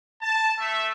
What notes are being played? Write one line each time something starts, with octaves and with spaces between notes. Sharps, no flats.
A5
A3 E5